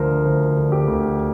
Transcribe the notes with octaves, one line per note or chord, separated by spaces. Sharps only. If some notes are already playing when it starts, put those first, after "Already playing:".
Already playing: D2 D3 F3 A#4 C5
D2 C5
D3
G4
D2